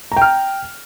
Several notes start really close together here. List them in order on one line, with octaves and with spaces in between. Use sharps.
A#5 G5 F6